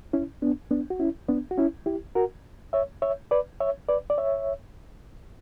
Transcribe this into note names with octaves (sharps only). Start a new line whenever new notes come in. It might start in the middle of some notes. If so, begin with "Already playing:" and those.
C#4 E4
B3 D4
B3 D4
F#4
C#4 E4
B3 D4
F#4
C#4 E4
E4 G4
F#4 A#4
C#5 E5
C#5 E5
B4 D5
C#5 E5
B4 D5
D5
C#5 E5